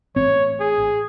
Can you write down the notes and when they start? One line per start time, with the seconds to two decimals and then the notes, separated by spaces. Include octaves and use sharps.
0.16 A1 C4 C#5
0.60 G#4